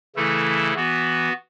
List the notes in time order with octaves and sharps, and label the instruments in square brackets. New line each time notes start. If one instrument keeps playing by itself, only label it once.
[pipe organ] C#3 E3 A3 E4 A4
E3 B3 F#4